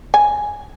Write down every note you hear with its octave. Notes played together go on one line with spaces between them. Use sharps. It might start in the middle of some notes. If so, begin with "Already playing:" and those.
G#5